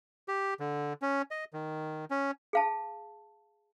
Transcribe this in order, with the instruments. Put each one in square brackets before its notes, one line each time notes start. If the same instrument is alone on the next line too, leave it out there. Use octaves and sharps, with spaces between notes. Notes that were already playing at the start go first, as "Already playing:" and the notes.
[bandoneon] G4
D3
C#4
D#5
D#3
C#4
[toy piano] G#4 F5 A5